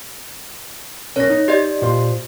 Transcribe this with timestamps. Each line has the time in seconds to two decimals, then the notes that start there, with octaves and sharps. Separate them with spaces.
1.16 B1 C#4 A#4 C#5 A#6
1.30 D#4
1.48 G4 D5 D#5
1.82 A#2 F4 C5